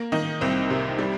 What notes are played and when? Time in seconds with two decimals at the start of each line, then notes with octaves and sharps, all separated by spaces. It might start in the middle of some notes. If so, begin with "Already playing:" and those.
Already playing: A#3
0.12 D#3 D#4
0.41 C2 C4
0.70 C3
0.99 G3